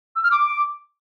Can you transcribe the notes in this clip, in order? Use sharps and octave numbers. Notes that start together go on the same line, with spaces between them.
E6
F6
D6